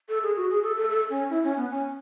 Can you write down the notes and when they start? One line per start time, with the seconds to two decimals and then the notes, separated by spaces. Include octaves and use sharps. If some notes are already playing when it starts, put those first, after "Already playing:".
0.09 A4
0.23 G#4
0.36 F#4
0.50 G#4
0.63 A4
0.77 A4
0.90 A4
1.10 C#4
1.30 E4
1.44 C#4
1.57 B3
1.70 C#4